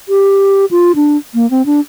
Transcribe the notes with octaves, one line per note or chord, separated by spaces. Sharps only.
G4
F4
D4
A#3
C4
D4